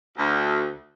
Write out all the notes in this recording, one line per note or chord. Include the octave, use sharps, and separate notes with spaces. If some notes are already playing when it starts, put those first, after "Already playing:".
D2